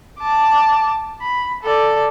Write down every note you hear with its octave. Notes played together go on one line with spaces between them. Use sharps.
A5 D6
B5
A4 D5